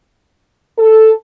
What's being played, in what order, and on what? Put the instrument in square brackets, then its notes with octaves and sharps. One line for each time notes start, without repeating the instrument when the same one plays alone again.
[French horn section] A4